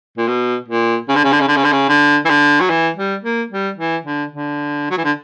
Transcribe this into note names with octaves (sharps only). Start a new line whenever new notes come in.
A#2
B2
A#2
C#3
D3
C#3
D3
C#3
D3
C#3
D3
C#3
D3
E3
D3
F#3
E3
G3
A#3
G3
E3
D3
D3
F#3
E3
D3